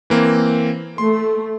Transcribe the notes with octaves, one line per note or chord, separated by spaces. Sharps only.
E3 A#3 C4
A3 C6